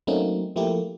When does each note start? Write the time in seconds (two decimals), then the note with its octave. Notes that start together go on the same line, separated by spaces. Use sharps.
0.07 F#3 A3 A#3 C4 C#4 D#4
0.56 F3 A3 A#3 E4 G4